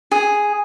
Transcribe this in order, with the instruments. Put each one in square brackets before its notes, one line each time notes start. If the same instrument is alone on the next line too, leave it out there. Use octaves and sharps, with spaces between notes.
[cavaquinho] G#4